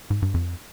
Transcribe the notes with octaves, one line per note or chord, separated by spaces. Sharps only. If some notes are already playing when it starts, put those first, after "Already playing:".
G#2
G2
F2